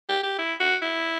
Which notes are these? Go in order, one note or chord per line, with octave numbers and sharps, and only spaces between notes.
G4
G4
E4
F#4
E4